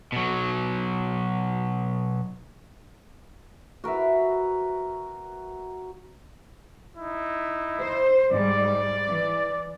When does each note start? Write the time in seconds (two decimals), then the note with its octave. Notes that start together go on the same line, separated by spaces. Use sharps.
0.12 B2 F#3
3.84 F#4 A#4 B4 E5
6.97 D#4 E4
7.81 C5
8.30 G#2 G3 D5
9.07 E3